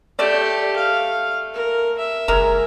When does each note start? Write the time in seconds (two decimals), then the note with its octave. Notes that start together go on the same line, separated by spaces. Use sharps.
0.19 A3 G4 D5
0.76 F5
1.54 A#4
1.98 E5
2.28 F#1 G#3 A#4